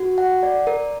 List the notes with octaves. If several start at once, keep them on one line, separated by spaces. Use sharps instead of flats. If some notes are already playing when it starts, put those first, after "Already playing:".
Already playing: F#4
F#5
D5
A#4